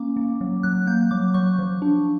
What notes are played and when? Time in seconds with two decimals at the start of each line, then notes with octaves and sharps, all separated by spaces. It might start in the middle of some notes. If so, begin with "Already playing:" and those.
Already playing: A#3 C#4 D6
0.16 A#3
0.41 F#3
0.63 F#3 F#6
0.87 A#3 G6
1.11 F#3 D6
1.34 F#3 C#6
1.59 F3
1.82 D4